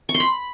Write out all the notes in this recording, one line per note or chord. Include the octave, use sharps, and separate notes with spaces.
C#6
C6
B5